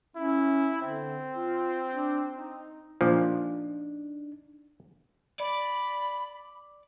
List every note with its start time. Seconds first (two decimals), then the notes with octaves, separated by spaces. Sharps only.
0.16 C#4 E4
0.81 D3 C4
1.36 F4
1.91 D4
2.31 D#4
3.01 A#2 F3 D4 D#4
5.40 D5 B5